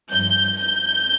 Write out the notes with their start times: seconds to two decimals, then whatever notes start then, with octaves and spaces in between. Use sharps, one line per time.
0.12 G2 F3 G6
0.57 G6